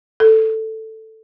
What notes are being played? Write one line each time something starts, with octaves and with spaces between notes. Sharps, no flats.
A4